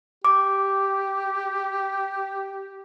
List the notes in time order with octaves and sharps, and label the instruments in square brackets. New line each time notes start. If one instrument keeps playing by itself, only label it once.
[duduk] G4 [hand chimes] D6